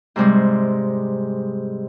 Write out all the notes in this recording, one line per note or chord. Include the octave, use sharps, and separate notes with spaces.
G#2 C3 G3 G#3